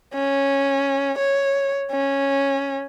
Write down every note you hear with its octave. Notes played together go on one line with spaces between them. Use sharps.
C#4
C#5
C#4